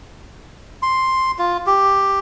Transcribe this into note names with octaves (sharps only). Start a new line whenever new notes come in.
C6
F4
G4